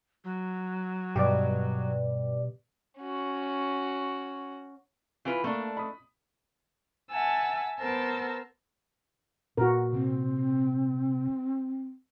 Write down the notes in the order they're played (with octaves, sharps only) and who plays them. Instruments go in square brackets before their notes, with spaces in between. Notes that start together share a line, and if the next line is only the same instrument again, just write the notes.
[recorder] F#3
[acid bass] G2 [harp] B2 G3 [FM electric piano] G4 D5
[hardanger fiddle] C#4 F#4
[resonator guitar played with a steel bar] E3 F4 B4
[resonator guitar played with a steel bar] A3 D4 [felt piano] A#3
[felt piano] B5 D#6
[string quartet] E5 F#5 G#5 A5 E6
B3 A#4 C5 A5 E6
[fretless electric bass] A#2 [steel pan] F#4 A#4
[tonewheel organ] C3 [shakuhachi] C4